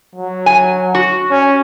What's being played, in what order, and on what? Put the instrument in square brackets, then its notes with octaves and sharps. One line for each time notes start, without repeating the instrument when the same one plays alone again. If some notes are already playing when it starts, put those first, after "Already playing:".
[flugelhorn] F#3
[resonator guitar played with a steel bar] G#5
F#4
[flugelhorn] C#4